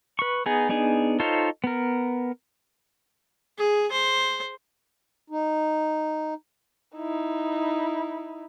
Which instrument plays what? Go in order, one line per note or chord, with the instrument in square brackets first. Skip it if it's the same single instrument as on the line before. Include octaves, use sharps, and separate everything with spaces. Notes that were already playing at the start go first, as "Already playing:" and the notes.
[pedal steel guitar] B4 C#6
B3 D#4 G#4
B3 D4 D#4 G#4
D#4 F4 A4 C5 C#5
B3 A#4
[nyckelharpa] G#4
C5
[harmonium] D#4
[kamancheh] D#4 E4